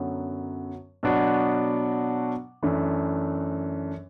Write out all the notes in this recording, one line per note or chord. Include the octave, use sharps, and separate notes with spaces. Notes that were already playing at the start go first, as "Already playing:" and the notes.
Already playing: F#2 D3 F#3 B3
B2 F#3 B3 D4 F#4
F#2 E3 A3 D4